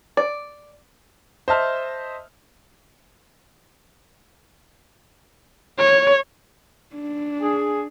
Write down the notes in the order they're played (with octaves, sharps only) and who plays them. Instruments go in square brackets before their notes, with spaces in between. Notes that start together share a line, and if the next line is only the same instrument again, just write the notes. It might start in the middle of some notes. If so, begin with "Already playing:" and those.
[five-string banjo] D5
[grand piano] C5 D#5 E5 A5 F6
[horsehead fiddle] C#5
D4
[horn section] G#4